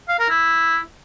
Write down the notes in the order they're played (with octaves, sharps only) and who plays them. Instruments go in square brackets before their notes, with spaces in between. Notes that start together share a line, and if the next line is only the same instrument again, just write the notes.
[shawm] F5
A#4
E4